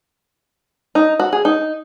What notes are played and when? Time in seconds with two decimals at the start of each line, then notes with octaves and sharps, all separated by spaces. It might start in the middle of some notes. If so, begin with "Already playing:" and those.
0.95 D#4
1.20 F#4
1.33 G#4
1.45 D#4